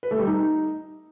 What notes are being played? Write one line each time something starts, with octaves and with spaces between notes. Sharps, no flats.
B4
A3
G3
D#4